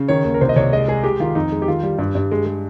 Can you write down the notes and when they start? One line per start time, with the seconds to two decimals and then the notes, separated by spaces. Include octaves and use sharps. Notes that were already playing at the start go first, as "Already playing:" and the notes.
Already playing: C#3
0.08 D#3 C#5
0.25 D#2
0.34 A#4
0.41 C2 C5
0.49 D#5
0.56 C2 C#5
0.73 G#3 D#5
0.88 G#3 G#4
1.04 G#3 G4
1.20 D#3 F4
1.35 F2 D#4
1.52 G#3
1.62 G4
1.68 D#3 F4
1.83 G3
1.99 G2
2.15 G2
2.31 G#3
2.46 G#3